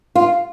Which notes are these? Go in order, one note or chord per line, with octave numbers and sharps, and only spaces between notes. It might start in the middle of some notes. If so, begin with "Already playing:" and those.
F4